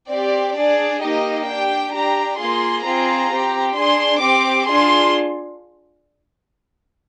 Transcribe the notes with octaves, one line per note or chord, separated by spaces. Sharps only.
C4 G4 D5
D4 G#4 D5
A#3 D#4 G4 D#5
D4 G4 G5
D4 G4 A#5
A#3 F4 G#4 C6
C4 F4 G#4 A#5
C4 G4
D4 G#4 C6
C4 G4 D6
D4 F4 G#4 C6